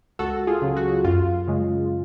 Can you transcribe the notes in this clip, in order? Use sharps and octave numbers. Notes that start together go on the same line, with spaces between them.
C#2 F#4 A4
F4 G#4
C#3 F#3
F#4
F#2 F4
C#3 G#3